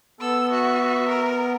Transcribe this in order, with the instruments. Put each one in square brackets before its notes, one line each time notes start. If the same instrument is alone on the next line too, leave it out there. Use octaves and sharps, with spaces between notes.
[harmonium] B3 [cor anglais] A4 [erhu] E6
[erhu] F#4 [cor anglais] E5
[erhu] A#4